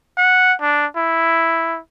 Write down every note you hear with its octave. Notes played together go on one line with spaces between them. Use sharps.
F#5
D4
E4